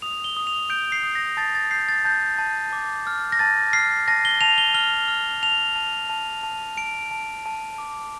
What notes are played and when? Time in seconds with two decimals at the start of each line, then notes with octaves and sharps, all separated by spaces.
0.02 D#6 F7
0.24 G7
0.37 D#6
0.47 F7
0.70 G6 D7
0.92 C7
1.03 D#6
1.15 A#6
1.37 A5 A6
1.55 A6
1.71 G6 C7
1.89 A6
2.05 A5 G6
2.39 A5
2.73 D6
3.07 F6
3.32 A#6
3.39 A5 A6
3.73 F6 C7
4.08 A5 A#6
4.25 G7
4.41 A5 F7
4.58 G7
4.74 F6 G7
5.08 F6
5.43 A5 F7
5.76 A5
6.10 A5
6.43 A5
6.77 A5 D7
7.11 A5
7.46 A5
7.78 D6